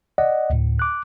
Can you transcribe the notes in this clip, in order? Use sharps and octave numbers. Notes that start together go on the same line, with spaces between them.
D5 D#5 F#5
D2 A2
D6 F#6